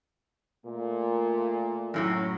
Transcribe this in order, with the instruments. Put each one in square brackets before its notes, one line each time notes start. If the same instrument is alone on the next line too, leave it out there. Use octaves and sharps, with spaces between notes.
[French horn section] A#2 A3
[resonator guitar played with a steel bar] F#2 A2 F#3